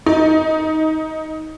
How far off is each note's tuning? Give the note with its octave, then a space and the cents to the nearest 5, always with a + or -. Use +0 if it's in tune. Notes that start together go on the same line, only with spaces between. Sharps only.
D#4 +15